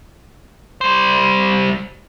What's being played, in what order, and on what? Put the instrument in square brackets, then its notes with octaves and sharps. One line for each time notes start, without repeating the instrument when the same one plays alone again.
[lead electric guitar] G3 C5